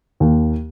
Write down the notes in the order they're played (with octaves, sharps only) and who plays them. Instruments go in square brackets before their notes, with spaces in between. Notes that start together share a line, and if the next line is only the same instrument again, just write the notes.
[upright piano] D#2